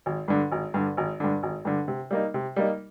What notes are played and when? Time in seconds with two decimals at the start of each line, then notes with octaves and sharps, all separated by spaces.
0.06 G#1
0.28 G2 D3
0.52 G#1
0.74 G2 D3
0.97 G#1
1.20 G2 D3
1.43 G#1
1.65 G2 D3
1.88 C3
2.11 G3 A#3 D#4
2.34 C3
2.56 G3 A#3 D#4